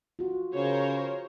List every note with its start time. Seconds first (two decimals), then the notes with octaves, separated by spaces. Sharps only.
0.19 F4 F#4
0.55 C#3 A#4 C5 C#5